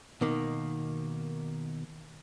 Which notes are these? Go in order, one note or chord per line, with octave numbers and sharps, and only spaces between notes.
B2 D#3 A#3